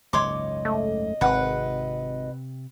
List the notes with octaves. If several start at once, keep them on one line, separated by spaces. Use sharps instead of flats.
F#1 C#2 G#2 C#5 D#5 C6 D6
A3
G#1 C3 C4 B4 F#5